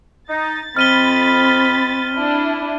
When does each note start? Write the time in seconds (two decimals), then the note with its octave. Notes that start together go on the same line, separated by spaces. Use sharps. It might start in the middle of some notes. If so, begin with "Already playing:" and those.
0.30 D#4 A6
0.76 F2 C4 D#5 B5 F6 D#7 G7
2.15 D4 E4